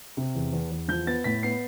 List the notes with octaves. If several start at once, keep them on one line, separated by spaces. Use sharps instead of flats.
C3
E2
E2
E2
F3 G6
B3 A6
A2 B6
B3 C7